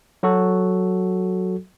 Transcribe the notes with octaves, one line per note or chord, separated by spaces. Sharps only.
F#3 F#4 A4